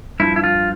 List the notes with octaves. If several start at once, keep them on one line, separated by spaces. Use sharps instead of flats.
G2 F3 E4
E4
F4